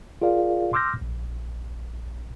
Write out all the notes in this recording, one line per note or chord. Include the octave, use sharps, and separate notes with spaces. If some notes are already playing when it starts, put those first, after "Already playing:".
F4 G#4 A#4 D5 F5
C6 D6 E6 F6 G6 A#6
A#1